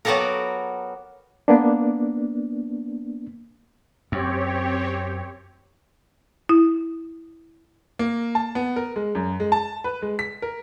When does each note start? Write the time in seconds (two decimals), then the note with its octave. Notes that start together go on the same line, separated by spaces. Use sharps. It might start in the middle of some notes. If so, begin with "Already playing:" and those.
0.05 F#3 B3 F#4 G4 A4 A#4
1.48 A#3 B3 D4
4.12 F#2 C4 G4 C#5
6.49 E4
7.99 A#3
8.35 A5
8.55 B3
8.76 A#4
8.96 G#3
9.15 F#2
9.40 G#3
9.52 A5
9.84 B4
10.02 G#3
10.19 B6
10.42 A#4